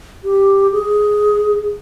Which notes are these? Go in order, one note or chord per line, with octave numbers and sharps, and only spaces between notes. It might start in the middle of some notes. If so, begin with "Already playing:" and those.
G4
G#4